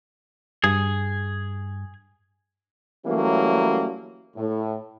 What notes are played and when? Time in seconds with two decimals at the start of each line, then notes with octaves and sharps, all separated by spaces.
0.64 G2 G#4
3.06 E3 F#3 G3 A3 A#3 C#4
4.36 A2